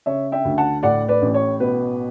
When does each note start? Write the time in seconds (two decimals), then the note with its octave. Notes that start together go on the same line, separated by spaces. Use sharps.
0.06 C#3 C#5 E5
0.32 E5 G5
0.45 D2
0.58 F#5 A5
0.83 A2 D5 F#5
1.08 B4 D5
1.22 A1
1.34 C#5
1.60 B2 B4